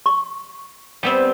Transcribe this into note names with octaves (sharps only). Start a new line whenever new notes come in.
C#6
G3 B3 C4